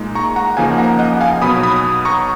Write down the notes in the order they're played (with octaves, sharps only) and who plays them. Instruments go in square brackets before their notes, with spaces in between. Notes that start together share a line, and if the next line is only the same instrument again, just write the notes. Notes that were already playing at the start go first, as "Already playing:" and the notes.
Already playing: [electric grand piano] A#2 G#3 D#4
A#5 C#6
F#5 A#5
C#3 F3 A#3 D#4 F5 G#5
F#5 A#5
D#5 F#5
F5 G#5
B2 F#3 B3 D#4 B5 D#6
B5 D#6
A#5 C#6